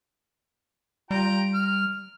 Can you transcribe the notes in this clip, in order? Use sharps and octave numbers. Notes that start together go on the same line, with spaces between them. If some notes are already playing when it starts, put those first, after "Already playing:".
G3 F4 G5 A#5
F6